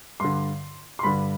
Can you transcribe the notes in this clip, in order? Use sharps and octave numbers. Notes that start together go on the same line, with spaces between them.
G2 D3 C6
C6
G2 D3 B5